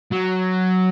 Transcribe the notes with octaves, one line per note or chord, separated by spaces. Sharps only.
F#3